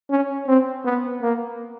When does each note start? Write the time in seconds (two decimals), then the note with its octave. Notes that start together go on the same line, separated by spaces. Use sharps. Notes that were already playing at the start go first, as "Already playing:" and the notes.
0.10 C#4
0.48 C4
0.85 B3
1.22 A#3